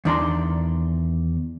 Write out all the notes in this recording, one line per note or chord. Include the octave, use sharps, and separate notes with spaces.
E2 D#3 D4 D5 A#5 C6